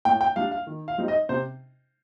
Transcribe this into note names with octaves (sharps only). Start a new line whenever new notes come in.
A2 G5
G5
G3 D4 F5
F5
D#3
F5
G3 C4 D#4
D#5
C3 C5